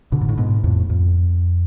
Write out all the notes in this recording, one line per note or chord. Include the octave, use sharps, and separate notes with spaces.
B2 D3
G#2
A2
G#2 B2
F2 A2
F2